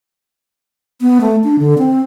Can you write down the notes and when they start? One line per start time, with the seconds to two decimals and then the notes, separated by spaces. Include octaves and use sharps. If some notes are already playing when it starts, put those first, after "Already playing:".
1.01 B3
1.21 A3
1.44 D4
1.59 D3
1.78 C4